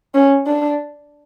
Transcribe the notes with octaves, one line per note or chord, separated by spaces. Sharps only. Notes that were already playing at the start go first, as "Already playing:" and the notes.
C#4
D4